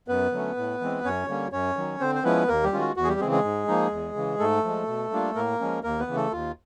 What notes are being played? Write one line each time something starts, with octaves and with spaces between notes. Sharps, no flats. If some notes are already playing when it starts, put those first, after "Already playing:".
F#2 B3 B4
D3 F#3 A3 C#4
A2
E3 G#3 C4
F#2 C#4 C#5
D3 G3 A#3 C#4
F#2 C#4 C#5
D#3 F#3
D3 C4 C5
C5
F3 G#3 B3 C#4 E4 B4
D#2 A#3 A#4
G3 G4
D#3 G#3 C#4 F4
F#4
E2 F#4
G#4
G3 G4
C#3 E3 G#3 C4 G#4
G#3 G#4
G#2
F3 A#3 D#4
E2
C#3 E3
G#2 A3 A4
F3 G#3
B2
G3 A#3 D4 F4
A2 A#3 A#4
F3 G#3 C#4
D#2 A#3 A#4
B3 B4
C#3 E3
A3 A4
D#2 F4